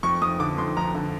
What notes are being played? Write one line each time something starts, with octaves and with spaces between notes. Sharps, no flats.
F2 C#6
F2 D#6
D3 D6
F2 C6
F2 A#5
D3